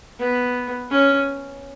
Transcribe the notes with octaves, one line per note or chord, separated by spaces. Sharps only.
B3
C#4